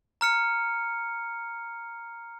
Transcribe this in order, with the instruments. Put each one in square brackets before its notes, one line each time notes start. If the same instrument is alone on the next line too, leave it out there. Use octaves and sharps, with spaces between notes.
[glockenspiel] A#5 F6 C#7